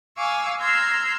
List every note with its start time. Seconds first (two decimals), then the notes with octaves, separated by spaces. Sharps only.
0.17 F5 G#5 C#6 D6 E6
0.60 A#5 C6 E6 F6 G6 G#6